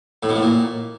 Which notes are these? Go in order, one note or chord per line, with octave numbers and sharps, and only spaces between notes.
A2
B2
A2
A#2